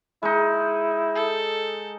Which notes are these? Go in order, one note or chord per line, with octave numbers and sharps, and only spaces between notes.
G#3 D#4 E4
A4